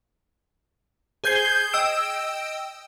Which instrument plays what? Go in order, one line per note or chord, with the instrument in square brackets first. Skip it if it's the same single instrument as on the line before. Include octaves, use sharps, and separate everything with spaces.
[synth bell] G#4 C5 G6 G#6 C7 G7
D#5 G5 E6 D7 E7